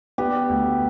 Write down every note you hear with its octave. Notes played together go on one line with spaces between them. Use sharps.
B3 G4
D2